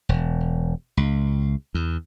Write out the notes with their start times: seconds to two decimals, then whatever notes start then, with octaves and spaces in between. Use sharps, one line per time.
0.09 E1
0.97 C#2
1.75 E2